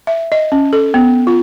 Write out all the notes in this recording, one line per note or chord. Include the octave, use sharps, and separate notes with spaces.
E5
D#5
C#4
A4
B3
F4